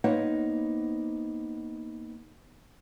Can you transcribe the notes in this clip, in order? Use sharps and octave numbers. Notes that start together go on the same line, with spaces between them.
A#3 B3 D#4 C5 C#5 F#5